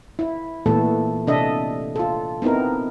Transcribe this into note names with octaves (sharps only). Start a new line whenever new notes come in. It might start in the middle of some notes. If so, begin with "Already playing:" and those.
E4
A#2 E3 A3 B3 A4
C3 D4 A4 D#5 E5
F4 A4
B3 C4 D#4 E4 A#4